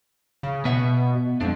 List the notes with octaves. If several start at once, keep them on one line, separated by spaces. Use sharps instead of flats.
C#3
B2 B3 E5 F#5
F2 G#3 D4